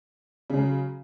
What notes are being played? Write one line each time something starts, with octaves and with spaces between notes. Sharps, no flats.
C#3 F#3 G#3